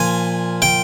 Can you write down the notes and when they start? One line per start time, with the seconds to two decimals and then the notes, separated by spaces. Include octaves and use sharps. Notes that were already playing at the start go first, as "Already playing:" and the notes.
Already playing: A#2 F3 G#5
0.62 G5